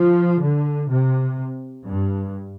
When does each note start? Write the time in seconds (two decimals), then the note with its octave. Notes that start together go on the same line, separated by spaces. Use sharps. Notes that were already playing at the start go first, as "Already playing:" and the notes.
Already playing: F3
0.40 D3
0.89 C3
1.87 G2